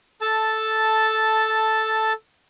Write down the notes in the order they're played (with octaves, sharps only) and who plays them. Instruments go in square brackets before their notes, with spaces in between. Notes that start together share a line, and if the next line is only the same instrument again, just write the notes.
[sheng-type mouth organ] A4 A5